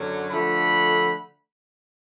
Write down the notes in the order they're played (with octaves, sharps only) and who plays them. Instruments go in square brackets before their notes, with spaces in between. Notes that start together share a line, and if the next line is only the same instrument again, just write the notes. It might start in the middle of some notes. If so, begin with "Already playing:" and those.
Already playing: [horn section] F#2 D3 F#3
D3 F3 A3 B5